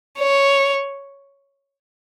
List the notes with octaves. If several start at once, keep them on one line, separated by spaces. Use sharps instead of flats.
C#5